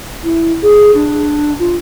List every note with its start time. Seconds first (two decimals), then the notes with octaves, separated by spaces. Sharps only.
0.24 E4
0.63 G#4
0.94 D4
1.59 F4